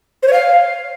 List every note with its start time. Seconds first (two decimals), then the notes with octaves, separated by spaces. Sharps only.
0.23 C5
0.28 C#5
0.33 F5